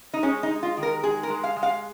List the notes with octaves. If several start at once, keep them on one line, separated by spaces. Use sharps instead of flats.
D#4
G#3 C#4
D#4
G#3
F4
D#3
A#4
G#3 G#4
A#4
G#3
F5
G#3
F5